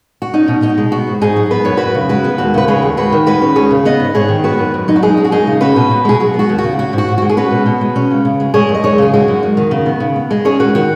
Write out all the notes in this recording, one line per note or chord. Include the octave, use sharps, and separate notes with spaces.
F#4
C#4 D#4
B2
B2 D#4
G#3
B3 F#4
G#2
G#2 D#4 G#4
F#3
B3 B4
F#2 C#5
F#2 F#4 B4
C#3
G#3 F#4 B4
B3
D#2 F#4
C#3 B4
G#3 G#4 C#5
D#2
D#2 F#4 B4
D#3
G#3 F#4 B4
C#4
D#2 G#4 C#5
C#3
B3 B4 D#5
G#2
G#2 G#4 C#5
D#3
B3 F#4 B4
F#2
F#2
F#3 D#4
F#4
G#3 D#4 G#4
C#4
F#4
F#2 D#4 G#4
C#3
C#4 F#4 B4
B2
B2
G#3 G#4
F#3 F#4
B3
F#4
D#2
F#4
C#3
C#4 F#4
G#2
F#4
G#2
G#3 F#4
G#4
C#4 F#4 B4
B2
B2
G#3
C#4
C#3
C#3
G#3
G#3 G#4 C#5
F#2
D#5
F#2 G#4 C#5
C#3 G#4
G#3 F#4
F#2
F#2
D#3
C#3
B3
C#3
B3
G#3
C#4 G#4 C#5
D#2 F#4 B4
D#3 F#4